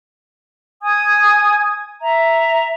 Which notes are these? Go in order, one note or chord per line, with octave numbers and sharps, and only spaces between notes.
G#5 D#6 G#6
E5 A#5